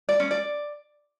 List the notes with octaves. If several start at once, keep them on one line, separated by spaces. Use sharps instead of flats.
D5
C#4
D5